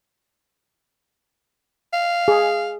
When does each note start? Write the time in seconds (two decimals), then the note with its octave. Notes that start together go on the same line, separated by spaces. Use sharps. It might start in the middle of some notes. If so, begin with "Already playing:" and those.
1.93 F5
2.28 G#4